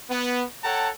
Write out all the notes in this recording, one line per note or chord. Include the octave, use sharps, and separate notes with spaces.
B3
A4 C#5 F#5 G5 A5 A#5